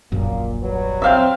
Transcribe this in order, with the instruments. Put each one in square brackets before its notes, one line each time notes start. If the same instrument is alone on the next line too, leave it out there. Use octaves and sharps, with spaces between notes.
[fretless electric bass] D#1 A#1 F#2 [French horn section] A#2 A#3
[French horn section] F#3 G3 B4
[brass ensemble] C4 [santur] E5 F5 G5